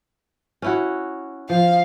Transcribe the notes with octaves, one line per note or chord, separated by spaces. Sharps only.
C#4 E4 F#4
F3 F5